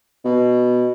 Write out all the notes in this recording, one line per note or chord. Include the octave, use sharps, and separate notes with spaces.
B2